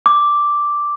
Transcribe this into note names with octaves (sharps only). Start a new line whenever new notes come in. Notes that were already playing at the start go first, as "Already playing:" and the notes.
D6